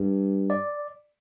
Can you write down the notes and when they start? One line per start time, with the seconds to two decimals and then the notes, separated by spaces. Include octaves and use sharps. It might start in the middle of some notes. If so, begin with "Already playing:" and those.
Already playing: G2
0.50 D5